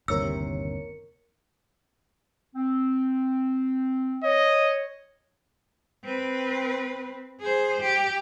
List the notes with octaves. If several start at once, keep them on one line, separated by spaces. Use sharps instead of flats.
G1 D#2 C3 A#4 C#5 E6 C#7
C4
C#5 D#5
C4 B4
G#4 C5
G4